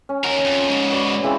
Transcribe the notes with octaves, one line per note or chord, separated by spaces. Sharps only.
C#4
D#2 A#4 F#5
F2
G#2 C#3
F#4 B4 D5
C#3 E3 C4